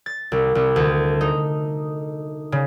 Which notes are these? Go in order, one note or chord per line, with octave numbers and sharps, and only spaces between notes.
A6
C2
C2
D2
D#4
C#3